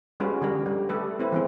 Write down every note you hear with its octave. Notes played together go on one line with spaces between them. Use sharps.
G3 G#3 C#4 F4 F#4 B4
D3 G3 A#4
G3
A3 G4 A4 B4
C4 E4 B4
E3 G#3 C4